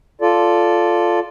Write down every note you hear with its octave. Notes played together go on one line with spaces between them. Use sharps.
F4 A4 D5